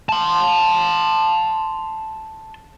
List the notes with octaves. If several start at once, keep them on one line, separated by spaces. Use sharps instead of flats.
A5 C6